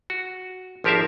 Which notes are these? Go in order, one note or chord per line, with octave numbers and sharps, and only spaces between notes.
F#4
G#1 F3 G4 A#4 E5 F5